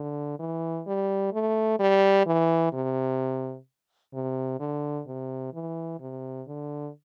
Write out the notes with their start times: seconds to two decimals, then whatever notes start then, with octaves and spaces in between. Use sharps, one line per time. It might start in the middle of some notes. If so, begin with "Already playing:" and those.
Already playing: D3
0.39 E3
0.87 G3
1.33 A3
1.79 G3
2.26 E3
2.73 C3
4.14 C3
4.60 D3
5.07 C3
5.53 E3
6.00 C3
6.47 D3